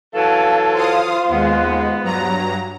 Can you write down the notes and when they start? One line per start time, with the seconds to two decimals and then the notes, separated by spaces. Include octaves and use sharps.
0.15 E3 F#3 A4 F5 A5
0.75 F4 C5 F5 D#6
1.29 D#2 G#3 B3
2.03 G2 F#3 A#5